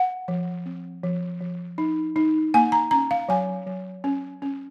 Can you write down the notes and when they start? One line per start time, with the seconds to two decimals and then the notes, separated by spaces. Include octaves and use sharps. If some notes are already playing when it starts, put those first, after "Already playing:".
Already playing: F#5
0.28 F3
0.66 C4
1.04 F3
1.41 F3
1.78 D#4
2.16 D#4
2.54 A#3 G#5
2.72 A#5
2.91 C#4 A#5
3.11 F5
3.29 F#3 G#5
3.67 F#3
4.04 C#4
4.42 C#4